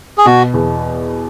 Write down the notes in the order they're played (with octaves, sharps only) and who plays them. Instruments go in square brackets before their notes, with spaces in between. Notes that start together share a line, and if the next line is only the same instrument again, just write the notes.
[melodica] G#4
[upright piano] B2 [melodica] F#4
[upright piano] E2